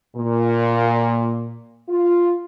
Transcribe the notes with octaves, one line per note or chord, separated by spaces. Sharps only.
A#2
F4